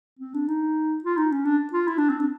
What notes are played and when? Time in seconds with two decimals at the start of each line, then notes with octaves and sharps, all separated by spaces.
0.19 C4
0.34 D4
0.48 D#4
1.04 F4
1.17 D#4
1.32 C#4
1.45 D4
1.73 F4
1.87 E4
1.98 D4
2.09 C4
2.19 D4